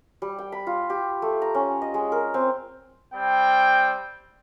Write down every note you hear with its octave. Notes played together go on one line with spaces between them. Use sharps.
G3
G5
B5
F4
G4
A3
A#5
C#4
D#5
G#3
A#4
C4
G3 C4 G5